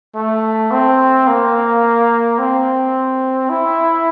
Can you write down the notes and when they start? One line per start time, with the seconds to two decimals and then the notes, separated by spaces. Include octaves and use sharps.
0.15 A3
0.71 C4
1.27 A#3
2.38 C4
3.49 E4